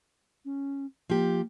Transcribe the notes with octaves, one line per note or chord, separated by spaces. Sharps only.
C#4
F3 A#3 G4